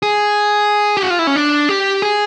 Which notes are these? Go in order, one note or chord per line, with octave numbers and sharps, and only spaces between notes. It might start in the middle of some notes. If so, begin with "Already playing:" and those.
G#4
G4
F#4
F4
E4
C#4
D4
G4
G#4